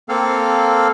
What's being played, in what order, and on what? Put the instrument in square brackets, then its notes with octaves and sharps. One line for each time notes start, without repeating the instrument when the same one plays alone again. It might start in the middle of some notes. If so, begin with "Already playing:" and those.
[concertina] A#3 C4 A4 F5